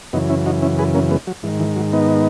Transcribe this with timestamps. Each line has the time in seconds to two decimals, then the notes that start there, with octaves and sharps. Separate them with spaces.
0.13 F#2 C#3 E3 B3 D#4
0.30 C#4 E4
0.46 D#4 F#4
0.62 C#4 E4
0.79 G#4 B4
0.95 A#3 C#4
1.11 G#3 B3
1.27 F#3
1.43 G#2 E3
1.48 D#3
1.60 E3
1.76 F#3
1.92 B3 D#4